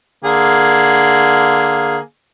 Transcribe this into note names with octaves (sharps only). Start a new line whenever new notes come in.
D3 A#3 G#4